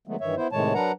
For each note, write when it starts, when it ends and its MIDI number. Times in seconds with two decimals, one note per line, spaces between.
0.07 0.16 51
0.07 0.16 54
0.07 0.16 56
0.07 0.16 57
0.07 0.16 59
0.21 0.35 43
0.21 0.35 51
0.21 0.35 52
0.21 0.35 73
0.21 0.35 76
0.36 0.48 59
0.36 0.48 64
0.36 0.48 72
0.52 0.73 45
0.52 0.73 48
0.52 0.73 51
0.52 0.73 56
0.52 0.73 73
0.52 0.73 81
0.74 0.92 54
0.74 0.92 62
0.74 0.92 70
0.74 0.92 71
0.74 0.92 78
0.74 0.92 82